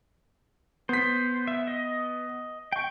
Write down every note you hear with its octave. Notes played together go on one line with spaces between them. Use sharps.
B3 C5 B6
E5
D#5
G5 C#6